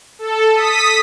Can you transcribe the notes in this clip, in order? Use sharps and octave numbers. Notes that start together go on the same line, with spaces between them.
A4
D#6 B6